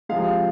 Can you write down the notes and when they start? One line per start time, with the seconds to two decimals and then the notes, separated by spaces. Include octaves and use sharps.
0.09 C3 F3 G#3 F5